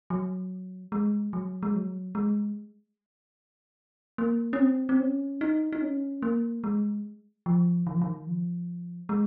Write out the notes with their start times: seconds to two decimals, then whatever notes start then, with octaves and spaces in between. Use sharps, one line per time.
0.10 F#3
0.92 G#3
1.33 F#3
1.63 G#3
1.74 F#3
2.15 G#3
4.18 A#3
4.53 C#4
4.59 C4
4.89 C4
5.00 C#4
5.41 D#4
5.73 D#4
5.82 C#4
6.22 A#3
6.64 G#3
7.46 F3
7.87 D#3
7.94 F3
8.02 D#3
8.27 F3
9.09 G#3